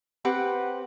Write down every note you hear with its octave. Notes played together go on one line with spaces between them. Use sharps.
C4 G4 B4 F#5